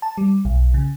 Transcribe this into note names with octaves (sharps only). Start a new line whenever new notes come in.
A5
G3
B1
C#3